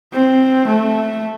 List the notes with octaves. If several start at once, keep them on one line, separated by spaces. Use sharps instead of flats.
C4
A3